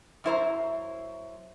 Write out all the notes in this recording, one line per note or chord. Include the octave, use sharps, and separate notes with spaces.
F#2 E4 C5 A#5